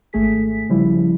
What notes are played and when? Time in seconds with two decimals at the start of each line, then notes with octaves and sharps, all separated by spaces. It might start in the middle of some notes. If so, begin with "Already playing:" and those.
0.13 G#1 A3 G#4 B6
0.69 C#3 F3 G3 E4